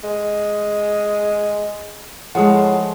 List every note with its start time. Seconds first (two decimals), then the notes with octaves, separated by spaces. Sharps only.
0.04 G#3
2.35 A2 F3 G#3 G#4 F#5